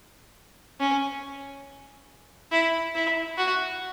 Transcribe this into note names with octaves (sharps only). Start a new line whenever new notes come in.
C#4
E4
E4
F#4